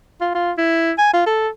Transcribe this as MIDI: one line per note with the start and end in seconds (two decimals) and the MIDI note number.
0.21 0.30 65
0.35 0.51 65
0.58 0.92 64
0.98 1.12 80
1.14 1.26 65
1.26 1.48 69